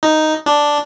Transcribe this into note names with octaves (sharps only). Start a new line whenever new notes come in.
D#4
D4